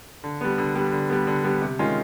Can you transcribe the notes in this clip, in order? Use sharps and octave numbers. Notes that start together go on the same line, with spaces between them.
D3
G3 B3
D3
G3 B3
D3
G3 B3
D3
G3 B3
C3
D#3 G#3 C#4 F4